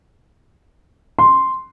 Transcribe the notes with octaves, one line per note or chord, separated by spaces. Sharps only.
C6